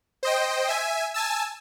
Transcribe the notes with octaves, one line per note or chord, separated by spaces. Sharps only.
C5 D#5 G5
E5 G#5
G#5 A5 E6